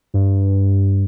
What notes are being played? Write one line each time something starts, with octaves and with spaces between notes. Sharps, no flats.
G2